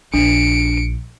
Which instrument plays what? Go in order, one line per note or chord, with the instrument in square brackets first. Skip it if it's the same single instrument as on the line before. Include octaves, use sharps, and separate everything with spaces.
[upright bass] A#1 [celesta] D4 [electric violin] C#7 D7